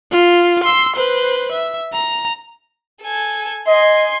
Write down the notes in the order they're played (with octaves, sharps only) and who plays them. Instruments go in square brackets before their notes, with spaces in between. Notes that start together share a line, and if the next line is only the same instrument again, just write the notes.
[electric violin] F4
C6 E6
B4 C5
E5
A#5
[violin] A4 G#5
[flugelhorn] D#5 [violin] G#5 C6